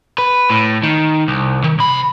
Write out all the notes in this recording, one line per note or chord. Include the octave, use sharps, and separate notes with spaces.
B4
A2
D#3
C2
D#3
C3 B5